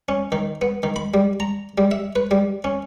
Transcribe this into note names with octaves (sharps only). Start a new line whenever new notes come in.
C#4
D#3
B3
D#3
B5
G3
A#5
G3
E5
B4
G3
C#4